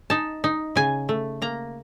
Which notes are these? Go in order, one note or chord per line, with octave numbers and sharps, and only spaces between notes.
D#4 A5
D#4
C#3 G#5
A3
A#3 A#5